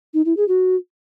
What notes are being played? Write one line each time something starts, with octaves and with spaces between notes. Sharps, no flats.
D#4
E4
G#4
F#4